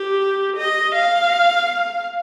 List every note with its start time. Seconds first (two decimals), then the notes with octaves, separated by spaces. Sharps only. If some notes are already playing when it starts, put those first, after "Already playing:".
Already playing: G4
0.57 D#5
0.95 F5